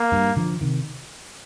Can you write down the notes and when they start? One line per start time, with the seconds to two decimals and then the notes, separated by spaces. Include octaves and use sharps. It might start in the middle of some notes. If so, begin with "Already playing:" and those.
Already playing: A#3
0.12 G2
0.37 D3 F3
0.61 C3 D#3